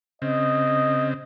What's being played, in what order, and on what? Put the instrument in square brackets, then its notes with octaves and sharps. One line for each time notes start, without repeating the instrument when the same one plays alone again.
[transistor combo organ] C#3 C4 [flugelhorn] D#5